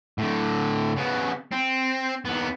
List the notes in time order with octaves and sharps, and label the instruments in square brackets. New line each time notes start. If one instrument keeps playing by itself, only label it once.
[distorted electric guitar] A2 D3
C#3 B3
C4
D#2 B3